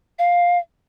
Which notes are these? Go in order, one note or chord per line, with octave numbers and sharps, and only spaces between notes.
F5